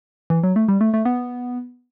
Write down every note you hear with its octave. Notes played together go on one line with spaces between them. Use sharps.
E3
F#3
A3
G3
A3
A3
B3